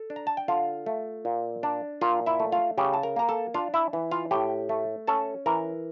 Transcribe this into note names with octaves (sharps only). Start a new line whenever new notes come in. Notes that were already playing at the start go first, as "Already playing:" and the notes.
Already playing: A4
D4
A#5
A5
G5
D3 F4 F5
A3
A#2
D4
A#2 F4 F5
E4 E5
A3
F4 F5
C#3 G4 G5
A5
A#4 A#5
A#3 A#5
A4 A5
D4 F4 F5
E4 E5
E3
F4 F5
A2 G4 G5
A3
C#4 A4 A5
E3 A#4 A#5